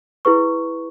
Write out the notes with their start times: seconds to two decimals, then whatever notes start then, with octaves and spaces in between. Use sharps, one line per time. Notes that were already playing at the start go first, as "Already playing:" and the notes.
0.25 E4 G#4 B4 C#6